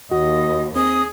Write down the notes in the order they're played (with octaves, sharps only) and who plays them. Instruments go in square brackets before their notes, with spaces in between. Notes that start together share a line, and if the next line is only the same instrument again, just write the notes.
[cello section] D#2 [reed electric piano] F#4 [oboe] D#5
[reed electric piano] C4 [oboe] G#4 [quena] D#6